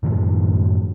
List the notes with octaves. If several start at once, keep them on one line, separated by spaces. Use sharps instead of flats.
F#2 A2 D#3 F3